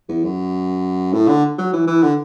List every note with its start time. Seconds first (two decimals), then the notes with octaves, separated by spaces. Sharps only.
0.08 E2
0.24 F#2
1.13 A2
1.28 D3
1.58 F#3
1.73 E3
1.87 E3
2.02 D3